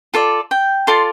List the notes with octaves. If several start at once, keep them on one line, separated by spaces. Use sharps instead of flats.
F4 A4 D5
G5
F4 A4 D5 C6